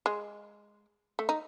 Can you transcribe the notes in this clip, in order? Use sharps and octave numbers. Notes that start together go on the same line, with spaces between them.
G#3
A3
D#4